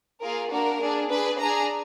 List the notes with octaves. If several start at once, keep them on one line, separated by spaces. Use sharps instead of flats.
A#3 F4 G#4 A#4
A#3 D4 F#4 A#4
D4 G#4
D4 G#4 B4
D4 G#4 A#5